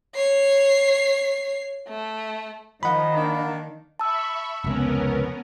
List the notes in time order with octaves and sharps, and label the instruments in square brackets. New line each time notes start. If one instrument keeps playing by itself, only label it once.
[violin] C#5 C7
A3
[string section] D#3 [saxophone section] F3 D#5 [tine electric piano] F#5 B5
[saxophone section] A#3 D4
[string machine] E5 B5 C#6 [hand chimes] A5 E6
[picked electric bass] F1 C#2 [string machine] B3 C#4 A#4